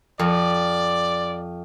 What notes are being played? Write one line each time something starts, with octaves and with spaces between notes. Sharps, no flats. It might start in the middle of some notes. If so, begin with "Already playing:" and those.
F2 D5